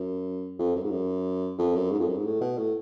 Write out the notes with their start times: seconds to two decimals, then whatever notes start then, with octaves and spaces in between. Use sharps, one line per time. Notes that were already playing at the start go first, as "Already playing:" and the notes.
Already playing: F#2
0.59 F2
0.76 F#2
0.84 G#2
0.91 F#2
1.59 F2
1.75 F#2
1.91 G#2
2.00 F2
2.08 F#2
2.17 G#2
2.25 A2
2.41 B2
2.58 A2